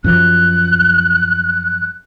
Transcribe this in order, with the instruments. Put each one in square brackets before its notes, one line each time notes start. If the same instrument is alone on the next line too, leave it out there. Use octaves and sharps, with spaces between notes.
[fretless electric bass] F#2 F3 [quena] F#6